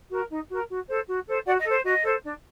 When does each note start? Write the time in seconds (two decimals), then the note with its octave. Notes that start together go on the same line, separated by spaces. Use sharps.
0.11 F#4 A#4
0.29 D#4
0.49 F#4 A#4
0.69 F#4
0.88 A4 C5
1.08 F#4
1.26 A4 C5
1.46 F#4 D5 F#5
1.59 D#5
1.65 A4 C5
1.85 F#4 D#5
2.03 A4 C5
2.23 D4